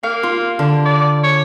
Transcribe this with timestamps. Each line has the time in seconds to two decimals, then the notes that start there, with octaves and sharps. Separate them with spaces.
0.03 A#3 F5
0.23 F4
0.59 D3
0.85 D5
1.23 C#5